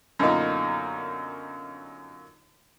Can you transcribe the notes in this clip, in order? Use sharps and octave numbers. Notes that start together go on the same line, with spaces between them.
F#2 B2 D3 A#3 D#4 F4